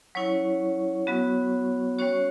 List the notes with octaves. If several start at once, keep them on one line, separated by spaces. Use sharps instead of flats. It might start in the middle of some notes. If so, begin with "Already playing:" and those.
F#3 C#4 E4 C#5 C#6
F#3 B3 F#4
G3 C#4 F#4 C#5 C#6